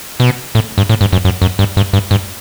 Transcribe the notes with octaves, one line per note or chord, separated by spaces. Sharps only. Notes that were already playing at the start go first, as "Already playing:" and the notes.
B2
A2
G2
A2
G2
F#2
F#2
F#2
G2
G2
G2
G2